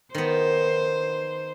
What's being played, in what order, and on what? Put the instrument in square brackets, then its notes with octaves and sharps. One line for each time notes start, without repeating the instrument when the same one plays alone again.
[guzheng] D#3 B3 [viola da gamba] C5